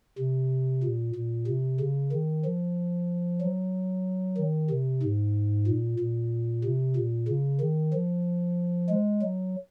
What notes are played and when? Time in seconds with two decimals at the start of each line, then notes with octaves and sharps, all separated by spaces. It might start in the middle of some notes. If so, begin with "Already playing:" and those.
0.19 C3
0.83 A#2
1.15 A#2
1.47 C3
1.80 C#3
2.12 D#3
2.45 F3
3.41 F#3
4.37 D#3
4.70 C3
5.03 G#2
5.67 A#2
5.99 A#2
6.64 C3
6.96 A#2
7.28 C#3
7.61 D#3
7.93 F3
8.89 G#3
9.22 F#3